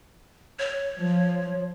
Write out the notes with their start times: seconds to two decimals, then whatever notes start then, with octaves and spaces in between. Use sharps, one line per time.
0.59 C#5
0.97 F3